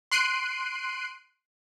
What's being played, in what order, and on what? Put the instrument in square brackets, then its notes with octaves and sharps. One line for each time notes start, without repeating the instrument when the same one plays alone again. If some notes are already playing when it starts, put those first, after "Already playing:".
[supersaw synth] C6 F#6 C7 D7 D#7